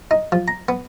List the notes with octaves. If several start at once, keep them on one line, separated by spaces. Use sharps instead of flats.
D#4
F3
A#5
B3